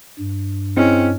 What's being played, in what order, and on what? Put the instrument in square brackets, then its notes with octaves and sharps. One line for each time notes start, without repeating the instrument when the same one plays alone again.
[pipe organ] G2
[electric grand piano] C4 [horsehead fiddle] C#4 [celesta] E4 G#4 D#5